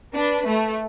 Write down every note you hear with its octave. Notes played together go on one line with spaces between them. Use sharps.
D4 B4
A3